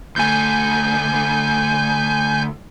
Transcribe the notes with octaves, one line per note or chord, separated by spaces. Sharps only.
D2 A3 G#5 G6